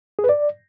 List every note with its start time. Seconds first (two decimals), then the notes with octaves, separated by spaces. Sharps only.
0.19 G#4
0.24 B4
0.29 D5